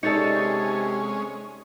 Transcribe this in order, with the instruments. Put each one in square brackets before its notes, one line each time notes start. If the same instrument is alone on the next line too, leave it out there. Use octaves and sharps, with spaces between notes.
[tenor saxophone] C3 [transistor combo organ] G#3 C#4 [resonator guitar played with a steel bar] D#4 A4 [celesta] D5 A6 C#7